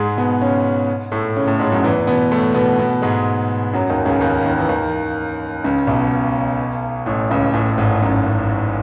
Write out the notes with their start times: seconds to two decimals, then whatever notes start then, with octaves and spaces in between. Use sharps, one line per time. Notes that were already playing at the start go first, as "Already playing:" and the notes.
Already playing: G#2 G#3
0.17 B2 B3
0.42 C#3 C#4
1.12 A2 A3
1.36 C#3 C#4
1.47 A2 A3
1.59 G#2 G#3
1.72 F#2 F#3
1.83 E2 E3
2.07 B2 B3
2.31 A2 A3
2.54 B2 B3
2.79 B2 B3
3.02 G#2 G#3
3.73 F#2 F#3
3.90 D#2 D#3
4.05 C#2 C#3
4.21 D#2 D#3
4.45 D#2 D#3
4.59 E3
4.69 D#2 D#3
5.64 C#2 C#3
5.87 B1 B2
7.06 A1 A2
7.30 C#2 C#3
7.54 A1 A2
7.72 A2
7.77 G#1 G#2
8.02 F#2